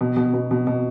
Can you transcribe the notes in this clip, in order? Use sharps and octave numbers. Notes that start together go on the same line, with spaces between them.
B2
B2
B2
B2
B2